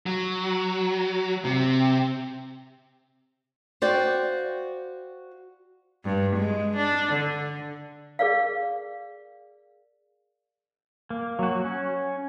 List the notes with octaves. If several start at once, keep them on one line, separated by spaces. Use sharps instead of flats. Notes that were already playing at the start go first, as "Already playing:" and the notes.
F#3
C3
F#4 C5 D5 F5 G5
G2
G#3
D4
D3
G#4 A#4 D5 F5
A#3
F#3 F#4
C#4